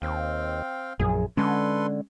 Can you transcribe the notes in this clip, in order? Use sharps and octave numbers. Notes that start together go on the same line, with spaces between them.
D#2 C4 F5 G5
A#1 F#2 G#4
D3 G#3 C#4 A4 B4 C6